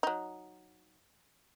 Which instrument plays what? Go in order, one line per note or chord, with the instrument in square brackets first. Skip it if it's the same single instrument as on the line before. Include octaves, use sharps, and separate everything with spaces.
[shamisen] F#3 D#4